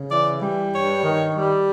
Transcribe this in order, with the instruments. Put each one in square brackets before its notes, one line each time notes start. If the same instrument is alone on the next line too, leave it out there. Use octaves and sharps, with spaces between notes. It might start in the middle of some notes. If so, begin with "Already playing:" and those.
Already playing: [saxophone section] C#3
E3 D5
G3
G2 C#5
D#3
G3